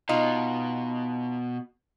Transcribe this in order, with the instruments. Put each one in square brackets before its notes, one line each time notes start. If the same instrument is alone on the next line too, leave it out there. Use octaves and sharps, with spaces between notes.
[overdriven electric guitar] B2 [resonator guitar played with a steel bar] D#4 F4